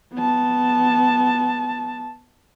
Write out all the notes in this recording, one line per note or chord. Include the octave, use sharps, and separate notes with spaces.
B3 A5